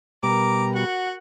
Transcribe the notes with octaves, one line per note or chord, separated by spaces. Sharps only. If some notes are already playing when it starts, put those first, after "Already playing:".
B2 G3 A#4 A#5 D6
F#4 F#5